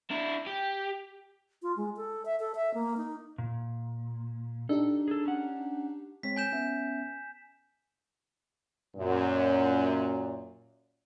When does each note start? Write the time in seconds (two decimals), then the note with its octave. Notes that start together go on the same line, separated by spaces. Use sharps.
0.10 D4 E4
0.46 G4
1.62 F4
1.77 G#3
1.97 A4
2.25 E5
2.40 A4
2.55 E5
2.74 A#3
2.97 D#4
3.38 A#2
4.69 D4 D#4 G4 A4
5.08 G#4 A4
5.25 C#4 F#5
6.23 G#3 C4 C#5 B6
6.36 G#5 G6 E7
6.52 B3 C#4 E5
8.97 F#2 A#2